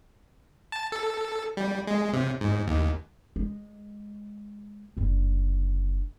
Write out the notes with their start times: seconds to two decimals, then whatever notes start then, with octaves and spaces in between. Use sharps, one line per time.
0.72 A5
0.92 A4
1.57 G3
1.87 G#3
2.13 C3
2.41 G#2
2.67 D#2
3.36 G#3
4.97 F#1 D3